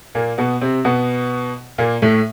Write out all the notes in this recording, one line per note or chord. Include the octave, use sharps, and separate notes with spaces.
A#2 A#3
B2 B3
C3 C4
B2 B3
A#2 A#3
A2 A3